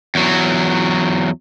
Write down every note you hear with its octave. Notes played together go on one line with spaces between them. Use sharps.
E2 F#3